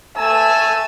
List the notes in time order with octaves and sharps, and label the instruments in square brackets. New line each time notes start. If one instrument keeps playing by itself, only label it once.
[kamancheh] A3 E6 [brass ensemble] G#5 A5